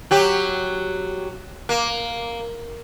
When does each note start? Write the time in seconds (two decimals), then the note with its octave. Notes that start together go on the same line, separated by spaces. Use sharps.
0.11 F#3 G4
1.69 A#3